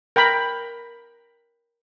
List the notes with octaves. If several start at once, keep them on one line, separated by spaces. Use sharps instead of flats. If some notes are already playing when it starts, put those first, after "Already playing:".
A#4 G5 A#5 B5